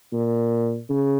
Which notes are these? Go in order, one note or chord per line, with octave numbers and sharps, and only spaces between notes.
A#2
C#3